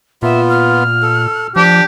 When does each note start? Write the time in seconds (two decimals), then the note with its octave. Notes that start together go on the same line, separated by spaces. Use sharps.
0.23 A#2 B3 F4 E5
0.50 F6
1.02 A4
1.56 F3 D4 G4